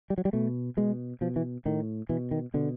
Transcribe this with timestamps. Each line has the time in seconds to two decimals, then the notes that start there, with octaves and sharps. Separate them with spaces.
0.10 G3
0.18 F#3
0.25 G3
0.33 B2 A3
0.77 B2 G#3
1.21 B2 F3
1.36 E3
1.65 A2 D#3
2.09 B2 E3
2.31 D#3
2.54 B2 D3